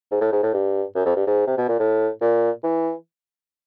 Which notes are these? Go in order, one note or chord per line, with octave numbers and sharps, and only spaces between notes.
G#2
A2
G#2
A2
G2
F#2
F2
G2
G#2
C3
B2
A#2
A2
A#2
E3